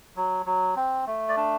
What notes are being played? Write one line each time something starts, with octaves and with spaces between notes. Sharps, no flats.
F#3
F#3
C4
A3
D5
D4